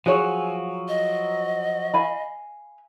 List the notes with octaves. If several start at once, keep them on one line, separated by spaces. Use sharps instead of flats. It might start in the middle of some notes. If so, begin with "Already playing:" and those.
F3 F#3 F#4 G#4 C#5 G#5
D#5
F5 G#5 B5